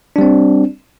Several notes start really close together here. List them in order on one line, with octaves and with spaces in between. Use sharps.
D4 G3 C4